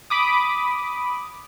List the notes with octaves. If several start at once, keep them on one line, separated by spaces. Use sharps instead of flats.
B5 D6 D#6